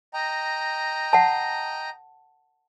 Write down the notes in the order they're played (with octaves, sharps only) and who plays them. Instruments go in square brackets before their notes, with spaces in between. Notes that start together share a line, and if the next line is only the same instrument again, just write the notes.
[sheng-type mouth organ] D#5 G5 A#5
[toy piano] F#5 A5